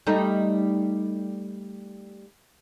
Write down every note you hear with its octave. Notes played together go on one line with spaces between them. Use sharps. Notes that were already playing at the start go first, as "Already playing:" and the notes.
G3 A3 D#4